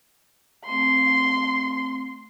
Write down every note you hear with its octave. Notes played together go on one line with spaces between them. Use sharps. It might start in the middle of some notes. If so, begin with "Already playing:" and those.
A3 C4 C6